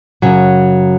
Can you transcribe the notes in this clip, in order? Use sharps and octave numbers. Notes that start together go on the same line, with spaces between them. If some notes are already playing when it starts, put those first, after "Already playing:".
F#2 C#3 F#3